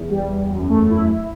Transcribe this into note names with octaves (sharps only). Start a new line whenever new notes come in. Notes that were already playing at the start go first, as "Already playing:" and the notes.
Already playing: E2
G3
E2
F#2
A3
E4
E4